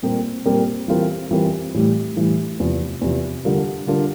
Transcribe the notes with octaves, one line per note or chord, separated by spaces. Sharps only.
A#2 G3 C4 G4 A#4
A#2 G3 C4 G4 A#4
E3 G3 C4 F4 A#4
E3 G3 C4 F4 A#4
A2 E3 G3
A2 E3 G3
E2 C3 F3
E2 C3 F3
D3 G3 D4 F4 A#4
D3 G3 D4 F4 A#4